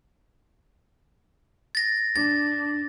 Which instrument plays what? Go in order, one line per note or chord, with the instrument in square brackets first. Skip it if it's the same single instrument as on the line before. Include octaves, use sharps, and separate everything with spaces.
[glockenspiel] A6 A#6
[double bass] D4 [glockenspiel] A6